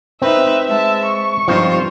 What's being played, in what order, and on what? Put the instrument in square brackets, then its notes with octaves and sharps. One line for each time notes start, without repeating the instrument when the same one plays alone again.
[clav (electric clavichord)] C4 [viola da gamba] D#4 B4 [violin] E5
[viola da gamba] G#3 [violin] E5 A5
[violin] C#6
[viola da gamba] G2 F4 C5 [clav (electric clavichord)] F3 C4 D#4